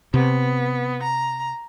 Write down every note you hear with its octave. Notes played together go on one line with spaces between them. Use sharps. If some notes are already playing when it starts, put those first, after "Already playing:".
C3 B3
A#5